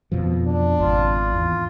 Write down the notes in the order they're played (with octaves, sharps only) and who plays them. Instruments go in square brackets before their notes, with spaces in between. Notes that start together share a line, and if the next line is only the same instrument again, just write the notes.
[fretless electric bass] F2 B2 F3
[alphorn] D4
[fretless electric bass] G#1 [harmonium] F4
[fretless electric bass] E2